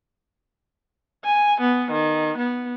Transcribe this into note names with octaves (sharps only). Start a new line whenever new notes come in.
G#5
B3
D#3
B3